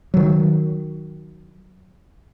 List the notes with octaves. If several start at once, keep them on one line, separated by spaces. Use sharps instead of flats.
D#3 F#3